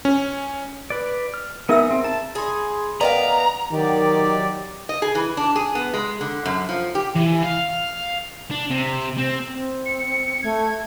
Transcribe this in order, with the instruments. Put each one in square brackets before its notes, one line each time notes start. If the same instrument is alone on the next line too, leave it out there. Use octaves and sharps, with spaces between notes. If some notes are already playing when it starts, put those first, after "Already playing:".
[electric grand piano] C#4
[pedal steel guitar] B4 D5
F6
[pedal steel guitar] B3 D#4 G#4 [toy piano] A#4 E5 E6
[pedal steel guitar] C4
[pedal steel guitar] A5 [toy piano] A#5
[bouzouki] D#4 G#4 [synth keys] B5 C6
[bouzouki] B3 A#4 F5 [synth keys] D5 D#5 G5 [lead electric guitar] A#5
[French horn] D#3 [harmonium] F#3 G4 D5
[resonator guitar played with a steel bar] D#5
G#4
E3
D4
G#4
B3
G#3
D3
F#2
F3
G4
[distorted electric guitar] E3
F5
D4
C3
C4
[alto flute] C4
[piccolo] C#7
[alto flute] A3 [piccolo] G#6